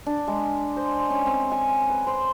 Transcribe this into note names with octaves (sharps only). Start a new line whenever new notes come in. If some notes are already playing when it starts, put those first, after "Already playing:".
D4
G#3
C5
C#4
C4
G#5
B4
C5